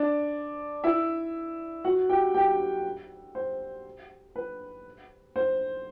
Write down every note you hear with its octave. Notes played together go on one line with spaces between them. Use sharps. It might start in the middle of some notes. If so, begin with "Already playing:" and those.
Already playing: D4 D5
E4 E5
F#4 F#5
G4 G5
G4 G5
C5
B4
C5